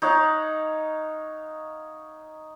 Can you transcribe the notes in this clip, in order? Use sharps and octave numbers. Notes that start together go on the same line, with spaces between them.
D#4 C#5 F5 F#5